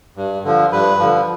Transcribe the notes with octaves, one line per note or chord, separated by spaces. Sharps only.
G2
D3 F3
G2 B4
D3 F3